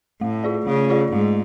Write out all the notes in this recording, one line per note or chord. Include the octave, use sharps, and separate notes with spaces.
A2 A3
F4 G#4 D5
C#3 A3
F4 G#4 D5
G#2 A3